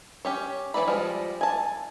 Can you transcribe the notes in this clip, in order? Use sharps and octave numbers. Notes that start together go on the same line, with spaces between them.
C#4 G4 C#5
E3 C#4 B4 D5 B5
F3 G3 G#3
G#5 A5